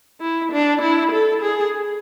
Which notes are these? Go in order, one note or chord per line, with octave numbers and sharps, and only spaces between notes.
E4
D4
E4
A4
G#4